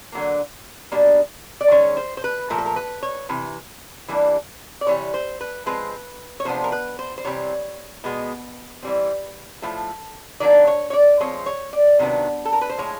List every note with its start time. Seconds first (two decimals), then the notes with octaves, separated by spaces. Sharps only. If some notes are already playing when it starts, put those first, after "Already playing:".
0.12 D3 F#3 A#3
0.92 B2 G3 A#3 D4
1.61 D5
1.71 D#3 G#3 C#4 C#5
1.97 C5
2.17 C5
2.24 B4
2.50 A#2 F3 A3 A#4
2.58 A4
2.66 A#4
2.76 B4
3.03 C#5
3.29 C3 E3
4.08 E3 G3 A#3 D4
4.81 D5
4.87 C3 E3 G3 C#5
5.14 C5
5.41 B4
5.66 F3 G#3 C4 B4
6.40 C#5
6.45 C3 F3 G#3 B3 D4 C5
6.64 A#4
6.72 B4
6.99 C5
7.18 C5
7.25 C3 E3 G3 C4 C#5
8.04 B2 G#3 B3
8.83 E3 G3 C4
9.62 A2 F3 A3
10.40 D#3 F#3 A#3 D4 D5
10.67 C#5
10.90 C#5
10.93 D5
11.20 F3 G#3 C4 C#5
11.46 C#5
11.73 D5
11.99 C3 D#3 F#3 B3 D4
12.45 A4
12.53 A#4
12.61 B4
12.70 C5
12.78 A2 F3 G#3 C#5